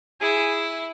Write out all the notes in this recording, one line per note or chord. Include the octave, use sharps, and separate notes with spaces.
E4 G#4